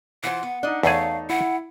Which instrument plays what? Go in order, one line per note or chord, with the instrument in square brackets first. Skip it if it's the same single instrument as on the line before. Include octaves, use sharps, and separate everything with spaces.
[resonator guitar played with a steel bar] E3 F4 C5 [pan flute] F#5
[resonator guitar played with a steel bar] B3
[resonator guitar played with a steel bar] D4 D#5 [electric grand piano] D#4 D5
[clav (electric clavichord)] E2 G#4 [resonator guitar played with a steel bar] A3 A4 C#5 [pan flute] F5
[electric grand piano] E4 [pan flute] F#5